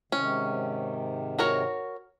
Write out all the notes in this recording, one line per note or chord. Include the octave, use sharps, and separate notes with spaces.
G#2 C3 D#3 C#4
F#4 A#4 C#5